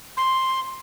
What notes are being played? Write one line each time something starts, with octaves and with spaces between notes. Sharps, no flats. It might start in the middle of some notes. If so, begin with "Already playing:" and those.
C6